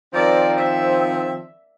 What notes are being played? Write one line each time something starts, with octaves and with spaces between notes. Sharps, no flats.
D#3 F3 C4 A#4 D5
E5